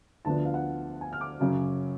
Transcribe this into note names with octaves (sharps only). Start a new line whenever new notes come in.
D2 D3 F3 B3 D4 A5
F5
F#5
G#5
F6
D6
F#2 C#3 F#3 C#4